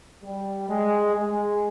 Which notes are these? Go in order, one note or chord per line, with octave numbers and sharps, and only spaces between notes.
G3
G#3
G#3